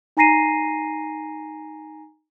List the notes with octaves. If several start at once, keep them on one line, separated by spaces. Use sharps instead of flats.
D#4 G#5 A#5 A#6 C7 D#7